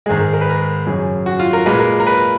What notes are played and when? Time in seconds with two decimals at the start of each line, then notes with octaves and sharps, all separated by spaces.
0.06 G#2 D#3 G#3 G#4
0.20 A#4
0.33 A#4
0.41 B4
0.49 A#4
0.87 F#2 C#3 F#3 G#4
1.26 F#4
1.39 F4
1.53 A#4
1.66 A#2 G#3 B4
1.79 A#4
2.00 A#4
2.07 B4